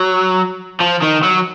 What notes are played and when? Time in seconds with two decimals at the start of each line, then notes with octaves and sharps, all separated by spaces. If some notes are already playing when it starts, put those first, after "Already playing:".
Already playing: F#3
0.80 F3
1.02 D#3
1.23 F#3